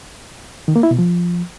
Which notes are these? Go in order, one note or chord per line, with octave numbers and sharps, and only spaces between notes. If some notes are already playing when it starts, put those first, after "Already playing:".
D#3
A#3
E4
B2
F3